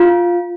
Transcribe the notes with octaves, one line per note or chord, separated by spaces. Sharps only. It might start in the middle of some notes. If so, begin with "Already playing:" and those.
Already playing: F4